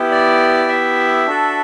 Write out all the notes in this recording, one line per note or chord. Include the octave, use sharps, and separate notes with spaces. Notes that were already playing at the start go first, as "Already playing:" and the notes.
Already playing: B3 E4 G4
D5
E5
D4 F#4 A4